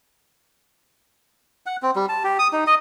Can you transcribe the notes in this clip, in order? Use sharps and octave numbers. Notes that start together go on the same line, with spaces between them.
F#5
C4
G3
A5
G4
D#6
D#4
D#5